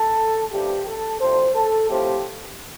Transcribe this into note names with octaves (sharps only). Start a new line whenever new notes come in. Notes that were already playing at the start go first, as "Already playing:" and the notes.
Already playing: A4
G2 F3 A3 G4
A4
D2 C3 F3 C5
A4
A2 F3 A3 C4 G4